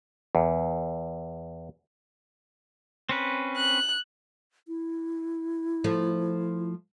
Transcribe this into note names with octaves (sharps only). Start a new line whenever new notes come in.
E2
C4 C#4 B4
F#6
E4
F3 A3